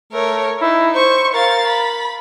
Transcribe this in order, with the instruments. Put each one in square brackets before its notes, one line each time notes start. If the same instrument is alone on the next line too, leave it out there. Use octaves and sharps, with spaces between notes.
[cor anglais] A3 [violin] A#4 C#5
[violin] D#4 [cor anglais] E4
[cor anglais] C5 [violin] C#6
[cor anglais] A#4 [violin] F5 A6
[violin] B5